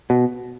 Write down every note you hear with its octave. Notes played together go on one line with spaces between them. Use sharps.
B2